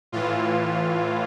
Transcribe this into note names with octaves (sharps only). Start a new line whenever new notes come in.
A2 E3 F4